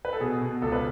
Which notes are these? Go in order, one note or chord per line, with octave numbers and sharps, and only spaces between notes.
B4
A4
B2 G#4
B2
C#2 A4
B4